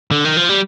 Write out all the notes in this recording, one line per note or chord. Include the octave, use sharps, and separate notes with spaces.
D3
D#3
F3
G3